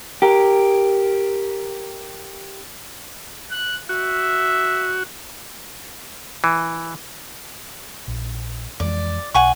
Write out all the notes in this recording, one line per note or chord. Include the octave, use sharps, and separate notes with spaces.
G4 A#4
F#6
F#4 E5
E3
A#1
F2 E3 G#3 D5
B1 F#5 G#5 C#6